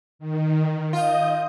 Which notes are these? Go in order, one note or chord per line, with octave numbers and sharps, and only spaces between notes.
D#3
F4 D#5 D#6 G6